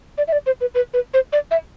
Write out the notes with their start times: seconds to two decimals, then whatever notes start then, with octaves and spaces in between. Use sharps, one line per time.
0.18 D5
0.28 E5
0.32 D5
0.46 C5
0.61 B4
0.75 B4
0.94 B4
1.14 C5
1.33 D5
1.51 E5